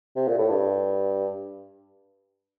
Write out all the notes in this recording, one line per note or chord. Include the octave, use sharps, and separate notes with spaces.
C3
A#2
A2
G2